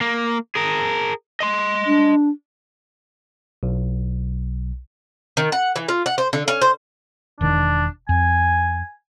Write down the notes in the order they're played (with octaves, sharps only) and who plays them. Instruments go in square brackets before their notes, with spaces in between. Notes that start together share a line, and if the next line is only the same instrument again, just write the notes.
[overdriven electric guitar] A#3
G#4 A#4
D#5 C6
[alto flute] D4
[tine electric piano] B1
[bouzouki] D#3
F#5
E3
F4
F#5
C5
D3
C#4
C5
[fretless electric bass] E1 D#3 [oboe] D4
[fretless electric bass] F2 [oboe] G#5